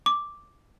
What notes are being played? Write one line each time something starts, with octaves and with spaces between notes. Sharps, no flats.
D6